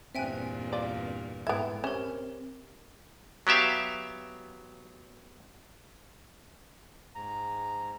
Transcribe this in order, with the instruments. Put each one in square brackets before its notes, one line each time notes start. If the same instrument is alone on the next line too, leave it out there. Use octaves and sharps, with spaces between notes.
[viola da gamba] E2 G2 A#2 [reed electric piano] C4 F#6 [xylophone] E5 G5 G#5
[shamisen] F4 D5
[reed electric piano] G#2 E4 A4 [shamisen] B3 E5 [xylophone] G5 G#6
[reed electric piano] C4 [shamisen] C#4 [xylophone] G4 A#4
[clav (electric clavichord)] F#3 B3 G4 E5 F5
[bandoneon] G#2 A#5